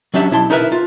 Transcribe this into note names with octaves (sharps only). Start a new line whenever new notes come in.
F#3 C#4 D4 G4 E5
B1 E4 A5 C6
D#4 E4 A#4 B4 E5
F4